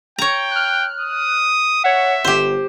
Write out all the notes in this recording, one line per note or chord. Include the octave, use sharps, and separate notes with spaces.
C#5 G5 A#5
F6 F#6
D#6
C#5 E5 F#5
G1 G4 C5